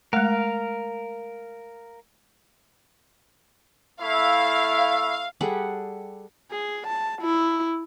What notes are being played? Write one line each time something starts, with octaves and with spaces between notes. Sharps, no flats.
G#3 A3 A#4 F5
A3 E4 F5
G3 G#4 A4 F#5
G#4
A5
E4